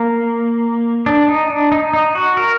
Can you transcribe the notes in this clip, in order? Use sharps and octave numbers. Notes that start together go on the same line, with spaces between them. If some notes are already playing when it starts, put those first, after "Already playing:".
Already playing: A#3
D4
D#4
D4
D#4
D#4
F#4
A#4